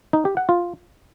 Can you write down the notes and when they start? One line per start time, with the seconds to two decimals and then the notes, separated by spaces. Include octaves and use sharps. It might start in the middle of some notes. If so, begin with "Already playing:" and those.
0.13 D#4
0.25 G4
0.37 F#5
0.49 F4